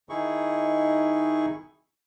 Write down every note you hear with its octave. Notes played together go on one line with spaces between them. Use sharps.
D#3 D#4 E4 G#4 C#6